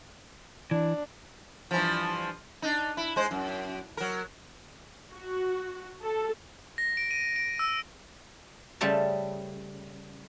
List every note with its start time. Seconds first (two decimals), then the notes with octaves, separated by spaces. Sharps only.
0.71 E3 D4
1.71 G2 E3 F3
2.62 D4 D#4
2.97 E4
3.16 G#3 C5
3.31 F#2
3.97 F#3 A#4
5.13 F#4
6.03 A4
6.78 A#6
6.97 D7
7.11 D#7
7.36 D7
7.59 E6
8.81 C#3 G3 A3 C5 A5